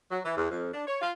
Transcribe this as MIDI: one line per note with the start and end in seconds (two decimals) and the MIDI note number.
0.11 0.19 54
0.25 0.33 52
0.37 0.49 40
0.51 0.71 41
0.73 0.84 62
0.87 0.98 73
1.02 1.11 65